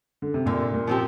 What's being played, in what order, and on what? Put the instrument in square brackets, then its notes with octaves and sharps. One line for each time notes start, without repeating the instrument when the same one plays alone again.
[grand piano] D3
C3
[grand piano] A#2 [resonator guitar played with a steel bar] D3
[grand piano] A#2
[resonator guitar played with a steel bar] F3 C4 G4